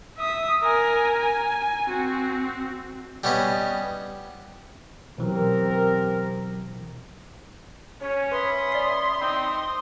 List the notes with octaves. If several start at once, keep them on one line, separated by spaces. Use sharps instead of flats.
E5 D#6
A#4 G#5
G#5
C4 F#4
G3 B3 C#4 D#5
B2 E3 F#3 C4 G4 A#4
C#4 C#5
B4 E5 B5 C6 D#6
D5 C7
C4 D#4 D#6